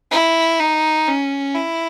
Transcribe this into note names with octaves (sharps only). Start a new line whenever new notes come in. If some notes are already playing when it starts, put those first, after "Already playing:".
E4
D#4
C#4
E4